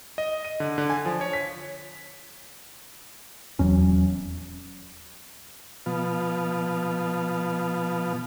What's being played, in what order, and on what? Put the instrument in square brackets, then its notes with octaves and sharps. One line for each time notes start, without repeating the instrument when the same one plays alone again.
[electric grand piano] D#5
D#7
D3
D3
G#5
F3
C#5
B6
[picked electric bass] D#1 F#3 C#4 [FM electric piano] E2
[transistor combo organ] B2 F3